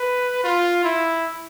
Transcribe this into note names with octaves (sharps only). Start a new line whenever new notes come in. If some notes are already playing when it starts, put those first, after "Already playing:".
Already playing: B4
F4
E4